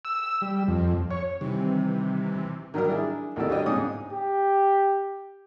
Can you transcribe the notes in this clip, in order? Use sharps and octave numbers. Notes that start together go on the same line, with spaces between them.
E6
G3
F2
C#5
C3 D#3 E3 G3
D#3 F#3 G3 G4 A#4
D4 E4 G#4
D2 D#3 E4 G4 A4 D5
G3 D4 F#4 G4 C#5 D#5
G#2 C#3 D4 D#4 G#5 D#6
G4